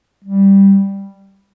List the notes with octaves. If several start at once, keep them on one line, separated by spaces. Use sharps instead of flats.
G3